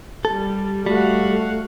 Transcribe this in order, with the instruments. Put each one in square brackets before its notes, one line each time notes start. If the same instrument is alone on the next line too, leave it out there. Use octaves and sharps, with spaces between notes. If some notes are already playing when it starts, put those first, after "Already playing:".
[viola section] G3 [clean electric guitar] A4
[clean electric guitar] G3 [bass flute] A3 [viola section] F#4 F5 F#5